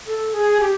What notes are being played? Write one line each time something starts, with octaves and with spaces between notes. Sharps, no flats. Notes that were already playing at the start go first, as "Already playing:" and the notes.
A4
G#4
G4